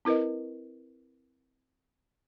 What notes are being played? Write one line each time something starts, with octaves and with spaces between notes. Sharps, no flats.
C4 E4 A#4 B4 D#5